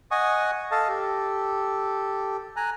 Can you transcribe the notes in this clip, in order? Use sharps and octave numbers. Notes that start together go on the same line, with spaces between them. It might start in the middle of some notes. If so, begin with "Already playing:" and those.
D#5 F#5 G#5 C#6 D#6
A4 D#5 F5 A5
G4 A4
G#5 A#5 F#6